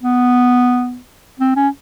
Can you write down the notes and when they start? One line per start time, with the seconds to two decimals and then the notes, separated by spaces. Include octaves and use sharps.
0.03 B3
1.40 C4
1.56 C#4